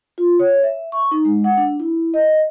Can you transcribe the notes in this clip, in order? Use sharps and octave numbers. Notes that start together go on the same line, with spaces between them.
F4
C#5
E5
C#6
D#4
G#3
F#5
D4
E4
D#5